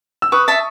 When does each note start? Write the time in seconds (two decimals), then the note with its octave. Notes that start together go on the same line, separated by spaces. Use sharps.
0.22 E6
0.32 B4 C#6 D#6
0.48 E5 A5